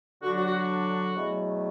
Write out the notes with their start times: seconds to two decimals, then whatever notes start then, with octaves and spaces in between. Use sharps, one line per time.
0.22 D3 F#3 D4 F#4
0.35 F#4
0.46 F#4
0.58 F#4
1.15 E2 B2 F#3 A3